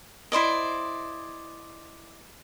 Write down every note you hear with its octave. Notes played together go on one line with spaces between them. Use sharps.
E4 C5 D5 D#5